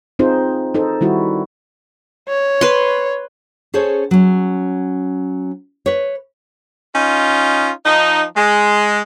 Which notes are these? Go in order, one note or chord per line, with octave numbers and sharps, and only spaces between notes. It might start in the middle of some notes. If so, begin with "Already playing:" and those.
C4 D#4 F4 G#4 C5
D#4 A4 C5
D#3 G3 E4 F#4
C#5
B4 C6
C#4 G#4 A4 C5 C#5
F#3 C#4
B4 C#5
C#4 D#4 F4
F3 D#4
G#3